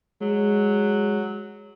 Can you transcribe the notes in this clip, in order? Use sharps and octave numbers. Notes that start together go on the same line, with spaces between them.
F#3 G#3